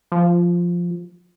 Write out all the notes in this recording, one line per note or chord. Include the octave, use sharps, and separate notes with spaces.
F3